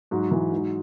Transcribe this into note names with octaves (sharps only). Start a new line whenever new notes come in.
G#2 F#3 F#4
E3
G#2